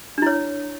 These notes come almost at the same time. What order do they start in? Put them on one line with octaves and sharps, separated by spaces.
D4 E4 C#5